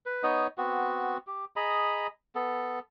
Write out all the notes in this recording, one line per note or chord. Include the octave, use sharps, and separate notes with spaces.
B4
B3 D#4 C#5 D#5
B3 C4 F#4
G4
G#4 D#5 A#5 B5
B3 A4